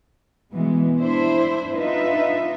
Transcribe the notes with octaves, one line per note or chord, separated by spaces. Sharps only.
B2 E3 G#3 B3
D4 E4 C5
D4 D#4 F4 B4 D#5 E5